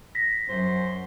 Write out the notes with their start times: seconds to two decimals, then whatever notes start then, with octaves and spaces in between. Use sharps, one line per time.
0.15 A#6 B6
0.49 F#2 C5